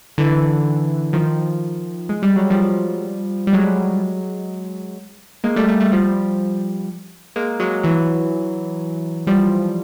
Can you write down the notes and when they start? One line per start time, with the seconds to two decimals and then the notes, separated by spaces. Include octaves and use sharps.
0.18 D3 E3
1.13 D#3 F3
2.09 G#3
2.23 G3
2.36 F#3
2.50 F3 G3
3.47 G3
3.53 F#3 G#3
5.44 G#3 A#3
5.56 G3 A3
5.68 G3 A3
5.80 G3 A3
5.92 F3 G3
7.36 G#3 A#3
7.60 F#3 G#3
7.83 E3 F#3
9.27 F3 G3